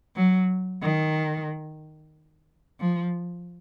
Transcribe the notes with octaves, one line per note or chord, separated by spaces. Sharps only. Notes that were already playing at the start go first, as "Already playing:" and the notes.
F#3
D#3
F3